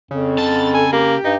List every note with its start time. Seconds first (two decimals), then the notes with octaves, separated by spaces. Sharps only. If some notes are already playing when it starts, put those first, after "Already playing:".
0.11 F2 C#3
0.38 C#3 A5 A6
0.74 A4 G#5
0.93 A#3 G4
1.25 G2 D#4